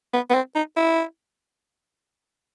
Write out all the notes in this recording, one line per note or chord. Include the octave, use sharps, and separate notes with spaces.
B3
B3
C4
D#4
E4